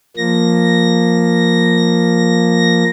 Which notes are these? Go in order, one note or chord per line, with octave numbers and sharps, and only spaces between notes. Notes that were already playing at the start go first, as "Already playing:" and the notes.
F3 A#3 A#6